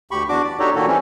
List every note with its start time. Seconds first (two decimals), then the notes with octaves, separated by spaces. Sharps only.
0.11 D2 G4 B5 C#6
0.29 E2 D4 F#4 D6
0.44 D5
0.59 D4 D#4 F#4 G4 A4 C#5
0.75 A#2 D#3 A#3 F#4 A4
0.87 E3 G3 C4 C#4